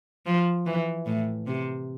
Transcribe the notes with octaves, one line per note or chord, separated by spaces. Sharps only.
F3
E3
A2
C3